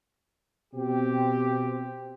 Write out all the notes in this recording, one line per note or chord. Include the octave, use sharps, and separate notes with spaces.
B2 C4 G4